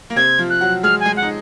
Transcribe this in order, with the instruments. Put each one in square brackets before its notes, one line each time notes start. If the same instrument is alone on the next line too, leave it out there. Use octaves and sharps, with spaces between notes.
[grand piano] A#3
[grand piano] C3 C4 [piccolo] G#6
[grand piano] F3 F4
[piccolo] F#6
[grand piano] F#3 F#4
[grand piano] G#3 G#4 [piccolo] F6
[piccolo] G#5
[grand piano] G#3 G#4
[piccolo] F#5
[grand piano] D#4